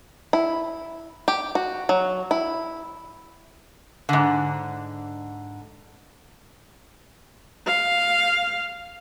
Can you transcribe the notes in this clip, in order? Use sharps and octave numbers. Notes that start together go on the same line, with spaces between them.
E4
G4
F#4
F#3
E4
G#2 D3
F5